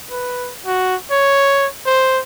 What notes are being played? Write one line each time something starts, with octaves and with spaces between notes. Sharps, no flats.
B4
F#4
C#5
C5